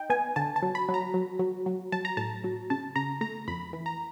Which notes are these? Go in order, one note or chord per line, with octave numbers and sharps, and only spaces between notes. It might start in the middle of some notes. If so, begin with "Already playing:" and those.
Already playing: D#4 G5
B3 G#5
D3 A5
A5
F#3
B5
F#3
A#5
F#3
F#3
F#3
F#3 A5
A#5
A2 A5
F#3
C#3 A5
C#3 A#5
A3 A#5
F2 B5
E3
A#5